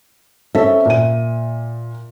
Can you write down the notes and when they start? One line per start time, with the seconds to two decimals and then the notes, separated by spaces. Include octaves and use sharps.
0.55 C4 C#4 A4 E5
0.85 A#2 D#7